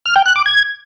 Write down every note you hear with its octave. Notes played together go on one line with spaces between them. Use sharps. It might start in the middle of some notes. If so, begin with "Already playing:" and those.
F6
G5
F#6
D6
G#6